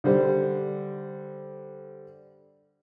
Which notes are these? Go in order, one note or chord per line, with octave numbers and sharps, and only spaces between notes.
D3 G3 C5